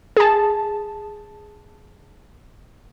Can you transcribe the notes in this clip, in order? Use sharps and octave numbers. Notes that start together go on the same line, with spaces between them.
G#4 A5